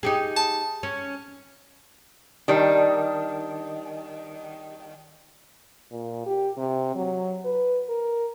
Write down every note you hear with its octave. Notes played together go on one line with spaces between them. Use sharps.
D#4 G4 G#4
A5
C#4
D#3 G3 D4
A#2
G4
C3
F#3
B4
A#4